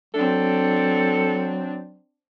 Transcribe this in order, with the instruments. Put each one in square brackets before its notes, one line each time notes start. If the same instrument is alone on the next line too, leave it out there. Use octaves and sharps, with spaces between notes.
[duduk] F#3 [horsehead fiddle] C4 D4 [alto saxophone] A4